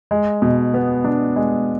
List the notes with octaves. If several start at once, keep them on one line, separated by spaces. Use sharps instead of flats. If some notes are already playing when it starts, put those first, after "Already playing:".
G#3
B2
B3
D4
G#3